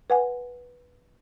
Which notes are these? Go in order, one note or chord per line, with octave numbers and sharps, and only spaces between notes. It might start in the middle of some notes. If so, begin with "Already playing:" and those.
B4 F#5 G#5